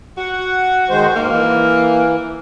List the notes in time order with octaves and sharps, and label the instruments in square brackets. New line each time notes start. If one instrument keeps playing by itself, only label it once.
[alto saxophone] F#4 [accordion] F#5
[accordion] D#3 G#3 C5
[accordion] G#2 [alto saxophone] A#3
[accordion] E3